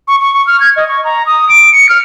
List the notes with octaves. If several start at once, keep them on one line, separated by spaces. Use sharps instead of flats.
C#6
C#6
C#6
F6
G#6
D#5
C#6
A#5
D#6
D7
C#7
F6